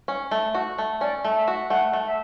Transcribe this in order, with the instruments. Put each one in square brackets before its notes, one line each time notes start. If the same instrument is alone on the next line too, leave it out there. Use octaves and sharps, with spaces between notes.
[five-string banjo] C#4
A3
F#4
A3
[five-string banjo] C#4 [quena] D5
[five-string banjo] A3
[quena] E5
[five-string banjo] F#4
[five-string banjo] A3 [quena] F#5
[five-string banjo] A3
[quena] E5